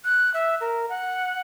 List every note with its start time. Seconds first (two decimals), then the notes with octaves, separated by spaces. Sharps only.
0.05 F#6
0.34 E5
0.61 A#4
0.89 F#5